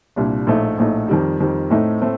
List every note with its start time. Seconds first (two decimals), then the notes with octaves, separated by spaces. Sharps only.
0.16 C2 A#2 G3 D4
0.47 A#1 A2 A3 D#4
0.78 A#1 A2 A3 D#4
1.08 F2 D#3 G3
1.40 F2 D#3 G3
1.70 A2 A3 C4 D#4
2.02 A2 A3 C4